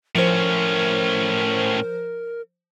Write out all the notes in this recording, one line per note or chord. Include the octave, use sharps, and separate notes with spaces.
A2 F3 C#4 A#4 C5